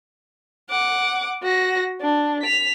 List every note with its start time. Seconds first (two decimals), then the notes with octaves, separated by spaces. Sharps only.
0.70 F#5 D6
1.43 F#4 A#6
2.01 D4
2.42 B6 F7